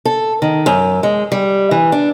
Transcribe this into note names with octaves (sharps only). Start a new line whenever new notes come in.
A4
D#3
F#2
G#3
G3
E3
D4